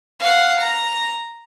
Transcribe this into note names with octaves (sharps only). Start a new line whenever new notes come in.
F5 F#5
A#5